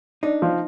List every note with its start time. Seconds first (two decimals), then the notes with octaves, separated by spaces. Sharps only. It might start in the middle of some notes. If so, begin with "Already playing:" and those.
0.23 D4 D#4
0.42 F3